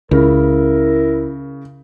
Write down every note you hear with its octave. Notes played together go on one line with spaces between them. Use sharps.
C#2 C#3 E4 A#4